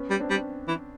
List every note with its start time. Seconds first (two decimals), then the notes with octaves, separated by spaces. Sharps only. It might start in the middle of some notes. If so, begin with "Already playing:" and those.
Already playing: B3 C#4
0.10 G3
0.20 C4 D4
0.30 G3
0.68 E3